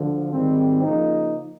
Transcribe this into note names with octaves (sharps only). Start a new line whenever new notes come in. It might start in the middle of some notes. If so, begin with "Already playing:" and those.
Already playing: D2 D3 F3
G#1 G#2 D#3 G3 C4
C#3 F3 A#3 D#4